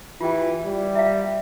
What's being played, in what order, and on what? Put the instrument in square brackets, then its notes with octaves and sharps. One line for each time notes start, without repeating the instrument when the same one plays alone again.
[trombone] E3 [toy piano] F4 G4 G5
[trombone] G3
[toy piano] E5 F5